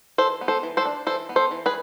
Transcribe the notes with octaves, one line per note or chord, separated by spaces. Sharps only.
E3 A4 C5
B3
A4 C5
E3
A4 C5
D4
E3 A4 C5
B3
A4 C5
E3
G#4 B4